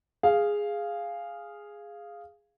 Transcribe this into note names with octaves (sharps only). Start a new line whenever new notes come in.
G#4 F5